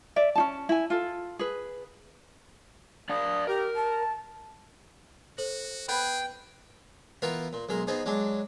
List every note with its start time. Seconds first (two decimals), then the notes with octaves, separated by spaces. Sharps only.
0.16 D5 E5
0.35 C#4 D#4 A5
0.69 E4 G#5
0.90 F4 A4
1.39 G#4 B4
3.09 D4 D5 F5 D#6
3.47 G4 A#4
3.76 A5
5.38 F#4 A4 C5 F#7
5.88 B3 G#4 B4 G5
7.22 E3 B3 F4 A#4 B4
7.53 A#2
7.69 B1 G#3 A#4
7.87 B3 C4 D#4 G#4
8.06 F#3 G#3 D4